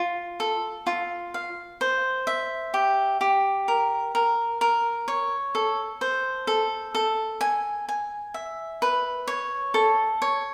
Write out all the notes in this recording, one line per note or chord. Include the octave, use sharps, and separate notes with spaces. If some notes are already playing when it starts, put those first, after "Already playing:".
Already playing: F4
A4
F4
F5
C5
E5
G4
G4
A#4
A#4
A#4
C#5
A4
C5
A4
A4
G#5
G#5
E5
B4
C#5
A4
C#5